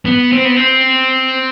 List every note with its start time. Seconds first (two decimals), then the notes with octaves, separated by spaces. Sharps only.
0.05 B3
0.32 C4
0.45 B3
0.56 C4